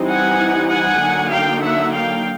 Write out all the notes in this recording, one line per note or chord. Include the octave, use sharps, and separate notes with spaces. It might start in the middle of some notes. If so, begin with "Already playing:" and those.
Already playing: E3 G3 C4 D#4
F#5 G#5
F#5 G#5
D3 F#3 A#3 D#4
F5 G5
E5 F#5
F5 G5